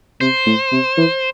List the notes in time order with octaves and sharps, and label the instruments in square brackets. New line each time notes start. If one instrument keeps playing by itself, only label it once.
[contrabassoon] C3 [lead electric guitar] C5
[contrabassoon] A2
C3
E3